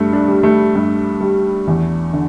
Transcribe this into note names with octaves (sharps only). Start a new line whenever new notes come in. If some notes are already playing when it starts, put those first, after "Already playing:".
Already playing: G2 A3
D4
G3
A3
G2
G3
E2
D3